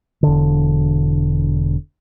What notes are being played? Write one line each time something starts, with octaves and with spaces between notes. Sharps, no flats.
E1 D3